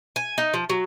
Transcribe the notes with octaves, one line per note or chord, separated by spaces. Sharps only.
G#5
D#4
F3
F#3